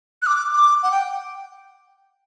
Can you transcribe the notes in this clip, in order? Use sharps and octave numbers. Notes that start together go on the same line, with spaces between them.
F#6
D6
D6
F#5
G5